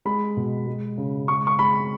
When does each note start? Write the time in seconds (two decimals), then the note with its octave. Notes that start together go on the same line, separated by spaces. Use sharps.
0.05 G#3 B5
0.37 B2
0.67 G#3
0.98 C#3
1.28 G#3 C#6
1.47 C#6
1.59 G#3 B5